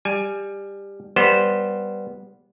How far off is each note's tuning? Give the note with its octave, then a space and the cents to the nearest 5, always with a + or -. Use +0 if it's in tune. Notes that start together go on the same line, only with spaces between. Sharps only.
G3 +15 G#5 +10
G3 +0 B3 -15 C5 +0